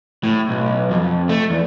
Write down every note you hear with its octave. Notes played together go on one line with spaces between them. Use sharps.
A2
B1
F2
A3
E2